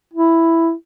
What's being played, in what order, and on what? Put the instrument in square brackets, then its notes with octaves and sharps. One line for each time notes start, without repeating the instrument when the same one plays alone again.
[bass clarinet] E4